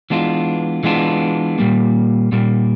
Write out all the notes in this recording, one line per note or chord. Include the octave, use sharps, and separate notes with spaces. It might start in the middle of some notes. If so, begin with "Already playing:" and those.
E3 G#3 B3 D4 F4
E3 G#3 B3 D4 F4
A#2 G3 A#3
A#2 G3 A#3